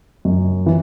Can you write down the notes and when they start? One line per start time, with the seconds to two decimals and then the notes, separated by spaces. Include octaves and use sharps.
0.25 F#2
0.66 E3